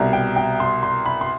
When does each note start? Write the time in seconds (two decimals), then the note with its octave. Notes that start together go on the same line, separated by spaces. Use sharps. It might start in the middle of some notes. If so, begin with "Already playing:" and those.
Already playing: C2 B2 G3
0.13 G5
0.36 G5
0.60 C6
0.83 C6
1.05 B5
1.21 C6